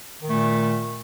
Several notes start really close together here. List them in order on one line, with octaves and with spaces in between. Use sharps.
D#3 A#2 A3